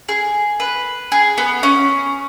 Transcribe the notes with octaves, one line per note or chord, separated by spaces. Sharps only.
G#4
B4
G#4
B3
C#4